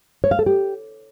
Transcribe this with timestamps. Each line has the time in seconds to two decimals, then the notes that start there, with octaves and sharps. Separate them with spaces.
0.24 C#5
0.31 F5
0.39 A4
0.46 G4